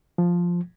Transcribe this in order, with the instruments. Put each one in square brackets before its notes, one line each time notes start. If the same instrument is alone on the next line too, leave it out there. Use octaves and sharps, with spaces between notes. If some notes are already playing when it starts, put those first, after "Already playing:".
[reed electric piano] F3